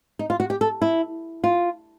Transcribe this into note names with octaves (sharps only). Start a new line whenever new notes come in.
D#4
F4
F#4
G4
A4
E4
F4